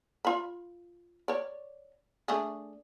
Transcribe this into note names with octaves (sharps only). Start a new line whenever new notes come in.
F4 B5
C#5 D5
A3 D4 G#4